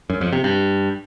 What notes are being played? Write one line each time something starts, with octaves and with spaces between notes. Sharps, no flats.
F#2
F2
C3
G2